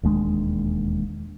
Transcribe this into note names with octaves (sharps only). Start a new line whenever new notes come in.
E1 D#2 G#3 D4